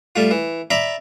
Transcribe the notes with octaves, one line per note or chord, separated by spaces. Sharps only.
G3 A3 F4
E3
D5 E5 A#5 B5